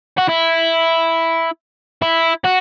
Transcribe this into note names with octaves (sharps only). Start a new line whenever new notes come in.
F#4
E4
E4
F#4